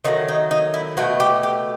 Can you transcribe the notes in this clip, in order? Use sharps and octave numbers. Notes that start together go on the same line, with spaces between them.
D#3 F#3 A3 D#4
D#4
D#4
E4
B2 A3 F#4
G4
G4